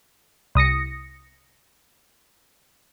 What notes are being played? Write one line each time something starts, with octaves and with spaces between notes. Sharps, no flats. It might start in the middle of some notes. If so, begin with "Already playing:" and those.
C2 D#6 A#6 C#7